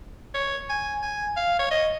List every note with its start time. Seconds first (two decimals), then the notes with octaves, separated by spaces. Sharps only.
0.34 C#5
0.69 G#5
1.02 G#5
1.36 F5
1.59 C#5
1.71 D#5